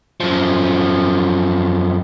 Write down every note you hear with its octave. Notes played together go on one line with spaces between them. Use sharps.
F#2 F3